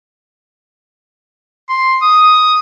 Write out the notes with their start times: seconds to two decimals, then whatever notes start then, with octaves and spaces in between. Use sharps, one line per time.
1.69 C6
2.02 D#6